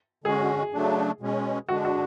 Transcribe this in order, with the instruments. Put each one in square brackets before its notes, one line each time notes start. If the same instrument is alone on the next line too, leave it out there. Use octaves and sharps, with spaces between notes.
[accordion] D3 G#3 C#4 F#4 [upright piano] G#4
[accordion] C#3 F#3 A3 D4
B2 G#3 C#4
[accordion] D3 G#3 D4 [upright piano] F#4
[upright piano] F#4